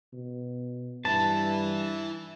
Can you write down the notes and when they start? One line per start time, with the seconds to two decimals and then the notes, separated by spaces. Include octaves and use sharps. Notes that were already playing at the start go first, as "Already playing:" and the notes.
0.13 B2
1.05 G2 E4 B4 A5